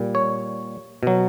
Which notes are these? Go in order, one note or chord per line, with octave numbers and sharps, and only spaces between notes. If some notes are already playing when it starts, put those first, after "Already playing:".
Already playing: A#2 G3
C#5
B2 F#3